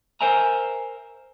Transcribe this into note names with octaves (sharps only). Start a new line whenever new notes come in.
A#4 C5 E5 G#5 A#5